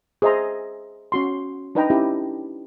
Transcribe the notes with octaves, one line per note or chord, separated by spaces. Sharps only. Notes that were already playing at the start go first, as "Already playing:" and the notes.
G#4 C5 D#5 E5 A#5 C6
C#4 F#4 C6
D4 D#4 B4 D#5 G5 A#5
C#4 E4 G4